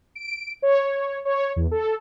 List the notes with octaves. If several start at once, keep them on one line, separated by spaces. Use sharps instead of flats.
D7
C#5
C#5
E2
A4